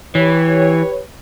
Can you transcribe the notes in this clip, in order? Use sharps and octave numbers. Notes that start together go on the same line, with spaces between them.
E3 G4 B4 C#5